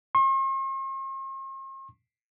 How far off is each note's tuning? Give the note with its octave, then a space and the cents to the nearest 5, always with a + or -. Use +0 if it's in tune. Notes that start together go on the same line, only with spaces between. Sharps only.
C6 +45